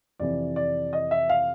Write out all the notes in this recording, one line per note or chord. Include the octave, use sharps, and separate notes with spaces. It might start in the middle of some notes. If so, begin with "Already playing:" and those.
F2 C3 E3 D5
D5
D#5
E5
F5